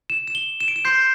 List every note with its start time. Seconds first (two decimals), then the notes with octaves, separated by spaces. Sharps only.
0.10 E7
0.28 E7
0.35 G7
0.60 E7
0.68 D7
0.76 E7
0.85 C6 G6 C7